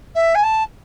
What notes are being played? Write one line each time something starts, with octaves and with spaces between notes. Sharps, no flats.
E5
G#5
A5